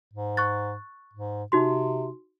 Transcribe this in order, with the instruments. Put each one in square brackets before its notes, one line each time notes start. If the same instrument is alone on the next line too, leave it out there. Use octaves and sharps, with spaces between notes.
[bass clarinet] G#2
[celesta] C#6 F#6 A6
[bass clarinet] G#2
[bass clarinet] C3 [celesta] D#4 F#4 C6